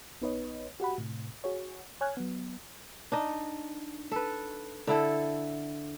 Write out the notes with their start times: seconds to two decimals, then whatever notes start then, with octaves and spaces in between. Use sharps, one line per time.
0.21 A#1 B3 D#4 B4 C#5 D#5
0.80 F#4 G4 F#5 B5
0.98 A2 C3
1.44 F#4 G#4 C#5
2.01 C#5 G#5 F6 F#6 G#6
2.17 F#3 B3
3.12 D4 D#4 D#5
4.11 A4 B4
4.87 D3 E4 A4